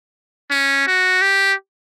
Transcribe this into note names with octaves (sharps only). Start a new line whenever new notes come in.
C#4
F#4
G4